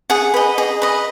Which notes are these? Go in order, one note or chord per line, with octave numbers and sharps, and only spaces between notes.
G#4 F#5
B4 D#5
G#4 D#5
B4 D#5